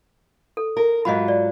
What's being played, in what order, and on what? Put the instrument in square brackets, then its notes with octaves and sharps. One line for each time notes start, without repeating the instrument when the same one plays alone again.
[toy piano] A4
[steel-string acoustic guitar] A#4
[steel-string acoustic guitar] G#2 F#3 F4 [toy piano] D#5 B5
[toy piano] D5